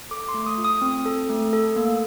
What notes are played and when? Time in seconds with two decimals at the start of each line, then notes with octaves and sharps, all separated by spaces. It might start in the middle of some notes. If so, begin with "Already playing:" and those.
0.11 A4 D6
0.28 C6
0.34 A3
0.46 D#6
0.58 F4
0.65 D#6
0.82 C4
1.06 A4
1.30 A3
1.53 A4
1.76 A#3